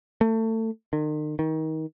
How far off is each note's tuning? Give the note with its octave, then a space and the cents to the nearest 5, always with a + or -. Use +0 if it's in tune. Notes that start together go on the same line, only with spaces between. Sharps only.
A3 +25
D#3 -40
D#3 +25